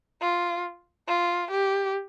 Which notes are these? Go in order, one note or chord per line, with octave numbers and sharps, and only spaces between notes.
F4
F4
G4